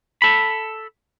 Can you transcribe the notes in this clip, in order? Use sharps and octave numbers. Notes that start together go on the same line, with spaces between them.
A4 B5